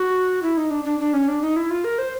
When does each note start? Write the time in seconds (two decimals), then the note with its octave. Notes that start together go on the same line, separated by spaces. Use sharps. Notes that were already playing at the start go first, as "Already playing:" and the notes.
Already playing: F#4
0.43 E4
0.57 D#4
0.71 D4
0.85 D4
1.00 D4
1.13 C#4
1.28 D4
1.42 D#4
1.56 E4
1.71 F4
1.84 A#4
1.98 C5